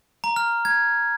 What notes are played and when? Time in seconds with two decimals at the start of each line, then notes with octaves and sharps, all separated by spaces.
0.24 A#5
0.36 F6
0.65 G#6